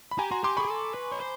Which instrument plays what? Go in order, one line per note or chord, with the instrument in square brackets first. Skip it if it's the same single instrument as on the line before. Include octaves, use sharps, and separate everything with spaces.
[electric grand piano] B5
[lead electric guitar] G4 [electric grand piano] G#5 A#5
[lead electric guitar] F#4 [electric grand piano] A#5 C6
[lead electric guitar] G4 [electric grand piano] C6 D6
[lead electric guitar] G#4 [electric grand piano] B5 C#6
[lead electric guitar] A4
B4
C#5
C5